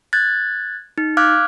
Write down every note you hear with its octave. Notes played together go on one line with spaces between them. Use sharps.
F#6 G#6 A6
D#4
F5 D6 F6 F#6 G#6